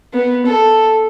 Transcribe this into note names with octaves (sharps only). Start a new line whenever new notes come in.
B3
A4